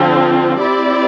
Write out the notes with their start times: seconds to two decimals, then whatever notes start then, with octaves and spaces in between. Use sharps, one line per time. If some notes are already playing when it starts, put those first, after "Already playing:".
Already playing: D3 F3 C4 F4
0.59 C4 E4 G4 D5